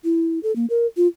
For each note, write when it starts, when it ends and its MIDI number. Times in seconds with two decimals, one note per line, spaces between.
0.04 0.39 64
0.43 0.54 69
0.56 0.66 58
0.70 0.86 70
0.97 1.07 65